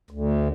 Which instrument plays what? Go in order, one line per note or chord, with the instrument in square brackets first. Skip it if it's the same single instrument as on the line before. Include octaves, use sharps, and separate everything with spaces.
[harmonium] D2